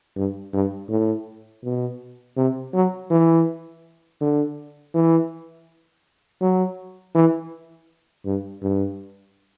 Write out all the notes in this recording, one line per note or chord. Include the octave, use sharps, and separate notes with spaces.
G2
G2
A2
B2
C3
F#3
E3
D3
E3
F#3
E3
G2
G2